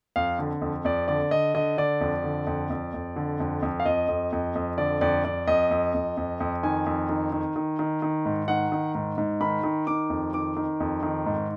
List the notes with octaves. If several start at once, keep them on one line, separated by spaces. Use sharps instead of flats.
F2 F5
D3
F2
F2 D5
D3 D5
D3 D#5
D3 D#5
D3 D5
F2
D3
F2
F2
F2
D3
F2
F2
F5
F2 D#5
F2
F2
F2
D3 D5
F2 D5
F2 D5
F2 D#5
F2
F2
F2
F2
D#3 G#5
F2
D#3
D#3
D#3
D#3
D#3
G#2
D#3 F#5
D#3
G#2
G#2
D#3 B5
D#3
D#3 D6
F2
D#3 D6
D#3
F2
D#3
G#2